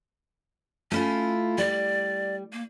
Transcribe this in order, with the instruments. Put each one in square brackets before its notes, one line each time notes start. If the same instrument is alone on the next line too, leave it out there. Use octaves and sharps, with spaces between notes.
[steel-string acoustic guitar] A3 E4 F4 [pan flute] C#4
[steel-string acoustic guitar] G3 [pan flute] D5
[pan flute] A#3